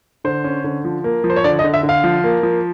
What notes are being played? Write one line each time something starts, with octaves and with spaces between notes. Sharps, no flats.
D3 C5
C#4
D3
F3
A#3
F3
C5
C#5
D3 D5
D#5
D3
E5
D3
F5
F3
A#3
F3